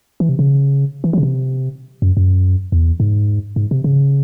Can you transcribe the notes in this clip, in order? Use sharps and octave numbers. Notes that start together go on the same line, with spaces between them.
E3
C3
C#3
E3
F#3
C#3
C3
F#2
F#2
E2
G#2
G#2
C3
C#3